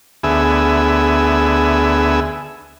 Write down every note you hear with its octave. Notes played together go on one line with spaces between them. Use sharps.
D2 B3 G#4 E5